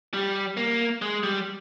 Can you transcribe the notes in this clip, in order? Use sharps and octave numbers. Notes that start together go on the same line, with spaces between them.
G3
A#3
G#3
G3